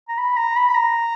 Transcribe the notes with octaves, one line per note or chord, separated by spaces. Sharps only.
A#5
B5
A#5
B5
B5
A#5